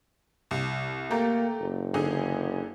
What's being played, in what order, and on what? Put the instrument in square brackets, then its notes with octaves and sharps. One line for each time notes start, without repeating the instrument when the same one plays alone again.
[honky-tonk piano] C2
[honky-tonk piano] A3 G4 A#5 [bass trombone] A#3
[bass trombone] F#1
[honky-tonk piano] D3 D#4 G#4